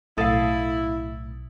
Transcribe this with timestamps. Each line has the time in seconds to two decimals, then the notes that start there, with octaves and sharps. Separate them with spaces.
0.18 B1 A2 E4 A4 F5 D#6 A6